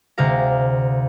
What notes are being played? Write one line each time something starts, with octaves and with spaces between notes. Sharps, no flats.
D2 C3 G#3 F5 A#5